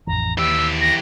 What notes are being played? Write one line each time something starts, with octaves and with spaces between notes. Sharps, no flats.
A1 F2 E3 A#5
D#2 E3 G4 E6
A#6